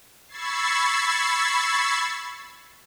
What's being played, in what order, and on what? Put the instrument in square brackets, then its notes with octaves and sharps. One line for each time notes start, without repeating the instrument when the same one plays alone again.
[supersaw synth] B5 C#6 E6 G#6 A6 C7